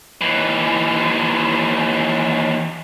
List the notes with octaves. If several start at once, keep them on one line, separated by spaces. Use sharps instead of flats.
D#2 E3